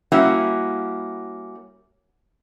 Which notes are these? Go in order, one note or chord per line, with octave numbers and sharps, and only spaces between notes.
G3 A#3 C#4 E4 F#4